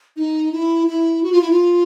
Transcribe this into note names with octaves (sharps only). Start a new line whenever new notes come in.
D#4
E4
E4
F#4
F4
E4
F4